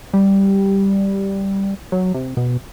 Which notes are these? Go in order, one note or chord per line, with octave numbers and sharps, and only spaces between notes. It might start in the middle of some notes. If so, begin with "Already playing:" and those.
G3
F#3
C3
B2